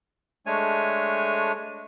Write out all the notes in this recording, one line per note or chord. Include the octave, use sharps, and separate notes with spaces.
G#3 A3 D4 C#5 G#5